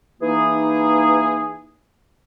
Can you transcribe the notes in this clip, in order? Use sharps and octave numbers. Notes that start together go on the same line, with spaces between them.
E3 A#3 D#4 G#4